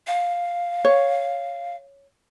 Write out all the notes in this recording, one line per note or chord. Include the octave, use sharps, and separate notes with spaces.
F5
C#5